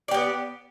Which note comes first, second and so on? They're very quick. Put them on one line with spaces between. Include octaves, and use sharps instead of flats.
D5 G4 B3